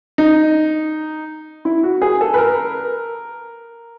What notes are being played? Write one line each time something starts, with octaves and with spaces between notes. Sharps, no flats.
D#4
E4
F#4
G#4
A4
B4
A#4